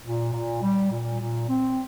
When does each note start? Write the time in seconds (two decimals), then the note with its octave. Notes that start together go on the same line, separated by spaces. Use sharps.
0.04 A#2
0.33 A#2
0.62 G3
0.91 A#2
1.20 A#2
1.49 C4